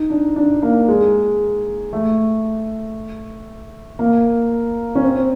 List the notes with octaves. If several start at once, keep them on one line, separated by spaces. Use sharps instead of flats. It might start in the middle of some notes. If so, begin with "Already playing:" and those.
Already playing: D#4
D4
D4
A#3
G#3
A3
A#3
C#4
C4